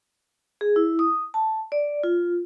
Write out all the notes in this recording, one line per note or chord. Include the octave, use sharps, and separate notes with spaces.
G#4
E4
D#6
A5
D5
F4